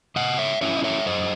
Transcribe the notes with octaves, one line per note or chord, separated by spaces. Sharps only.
C#3 D#5 F#5
C#5 E5
F#3 C#4 E4 C#5 E5
D#5
C#5 E5
F#2 C5 D#5